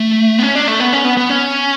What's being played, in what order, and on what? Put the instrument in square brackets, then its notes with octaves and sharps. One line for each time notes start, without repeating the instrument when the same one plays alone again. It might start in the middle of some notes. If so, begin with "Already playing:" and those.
Already playing: [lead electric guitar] A3
B3
C#4
D4
A3
B3
C#4
B3
B3
C#4